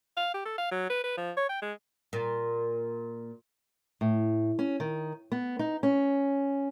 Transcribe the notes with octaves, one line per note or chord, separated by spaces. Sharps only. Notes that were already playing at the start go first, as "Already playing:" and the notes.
F5
G4
A4
F5
F#3
B4
B4
F3
C#5
G5
G#3
A#2
A2
C#4
D#3
B3
D#4
C#4